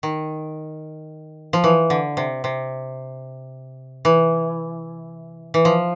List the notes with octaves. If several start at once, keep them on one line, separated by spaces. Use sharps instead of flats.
D#3
F3
E3
D3
C3
C3
E3
E3
F3